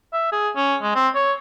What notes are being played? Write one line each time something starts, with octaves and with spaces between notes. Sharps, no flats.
E5
G#4
C#4
G#3
C4
C#5